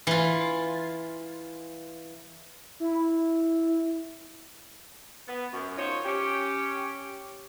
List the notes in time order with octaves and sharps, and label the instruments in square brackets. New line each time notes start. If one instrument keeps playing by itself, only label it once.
[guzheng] E3 F4
[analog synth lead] E4
[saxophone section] B3
F#2
D#4 F4 C5 C#5
C#4 G4